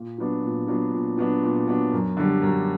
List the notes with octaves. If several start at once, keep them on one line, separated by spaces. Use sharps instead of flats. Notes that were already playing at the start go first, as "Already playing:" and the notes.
Already playing: A#2
F#3 B3 D4
A#2
F#3 B3 D4
A#2
F#3 B3 D4
A#2
F#3 B3 D4
F#2
D3 G3
F#2